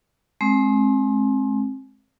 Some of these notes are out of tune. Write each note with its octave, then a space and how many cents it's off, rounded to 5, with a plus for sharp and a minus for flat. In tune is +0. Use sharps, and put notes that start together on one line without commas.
G#3 +30 C4 +30